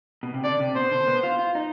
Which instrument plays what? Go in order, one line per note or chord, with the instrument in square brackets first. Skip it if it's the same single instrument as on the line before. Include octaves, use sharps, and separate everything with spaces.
[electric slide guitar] B2
C3
[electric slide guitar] D3 [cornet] D5
[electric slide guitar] C3
[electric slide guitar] B2 [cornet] C5
[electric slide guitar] D3
B3
F4
F4
D#4